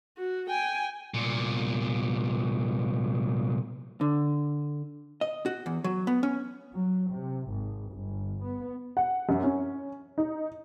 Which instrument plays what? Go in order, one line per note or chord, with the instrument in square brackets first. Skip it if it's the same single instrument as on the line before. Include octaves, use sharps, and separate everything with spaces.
[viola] F#4
G5 G#5
[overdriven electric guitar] C2 A#2
[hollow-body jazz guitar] D3
D#5
F#4
E2
F#3
B3
C#4
[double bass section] F#3
C3
G#1
G1
B3
[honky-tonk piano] F#5
F#2
C#4
D#4